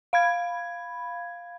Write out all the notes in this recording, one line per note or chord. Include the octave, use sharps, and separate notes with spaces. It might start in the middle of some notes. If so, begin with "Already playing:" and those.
F5 B5 G#6